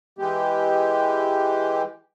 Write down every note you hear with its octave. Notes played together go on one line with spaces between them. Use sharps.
E3 G#3 G4